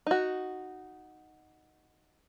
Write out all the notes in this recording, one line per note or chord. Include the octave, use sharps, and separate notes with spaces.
D#4 F#4